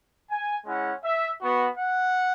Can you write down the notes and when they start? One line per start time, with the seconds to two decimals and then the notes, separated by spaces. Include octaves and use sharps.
0.30 G#5
0.66 G#3 C#4 E4 F#5
1.03 E5
1.40 B3 F#4
1.77 F#5